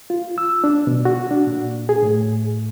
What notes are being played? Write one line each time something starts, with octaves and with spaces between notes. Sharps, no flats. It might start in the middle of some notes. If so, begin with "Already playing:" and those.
F4
E6
D4
B2
F#4
D4
A#2
G#4
A2